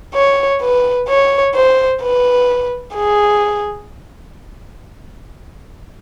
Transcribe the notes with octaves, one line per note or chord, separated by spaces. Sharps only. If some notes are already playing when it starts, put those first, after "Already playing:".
C#5
B4
C#5
C5
B4
G#4